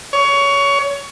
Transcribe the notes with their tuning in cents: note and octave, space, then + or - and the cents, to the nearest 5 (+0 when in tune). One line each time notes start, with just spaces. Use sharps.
C#5 +20